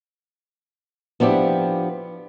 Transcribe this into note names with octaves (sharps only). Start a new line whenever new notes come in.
F3 B3 D4 E4 G4